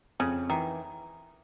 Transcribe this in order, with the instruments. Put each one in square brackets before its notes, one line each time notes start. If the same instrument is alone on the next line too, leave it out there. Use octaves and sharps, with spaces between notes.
[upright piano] F2 [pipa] C#3
[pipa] D#3 [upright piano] E3